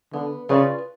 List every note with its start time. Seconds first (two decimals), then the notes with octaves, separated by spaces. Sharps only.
0.13 D3 B3
0.49 C#3 F4 G#4 B4 D5